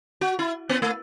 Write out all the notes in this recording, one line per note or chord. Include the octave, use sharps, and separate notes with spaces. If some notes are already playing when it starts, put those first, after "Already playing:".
F#4
E4
B3
A3